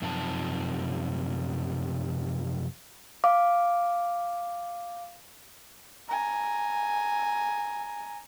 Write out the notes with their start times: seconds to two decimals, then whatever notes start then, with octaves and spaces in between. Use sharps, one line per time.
0.02 F#2 C3 F3 D#4 A5
3.24 F5 D6
6.08 G#5 A#5